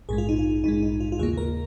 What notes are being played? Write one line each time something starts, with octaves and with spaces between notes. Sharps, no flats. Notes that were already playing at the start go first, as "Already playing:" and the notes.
A#1 G#2 G#3 G#4
F4
D#4
F4
A#1 G#2 G#3 D#4
D#4
F4
F4
D#2 C#3 A#3 G#4
A#4